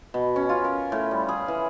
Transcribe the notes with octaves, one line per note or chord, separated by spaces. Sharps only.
B2
C#4
F4
A#4
A2
G3
G#4
E3